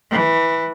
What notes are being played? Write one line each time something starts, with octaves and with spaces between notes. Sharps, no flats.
E3